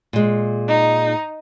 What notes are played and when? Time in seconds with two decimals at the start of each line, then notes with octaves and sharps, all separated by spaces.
0.13 A#2 G#3
0.68 D#4